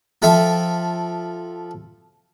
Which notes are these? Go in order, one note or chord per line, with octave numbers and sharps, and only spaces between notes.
F3 A4 E5 G5